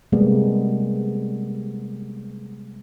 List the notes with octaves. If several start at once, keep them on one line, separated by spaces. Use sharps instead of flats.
C3 G3 G#3 A#3 B3